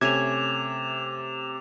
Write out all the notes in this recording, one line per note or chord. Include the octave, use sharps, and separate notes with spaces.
C3 A3 C#4 E5 D6 G#6 E7 F7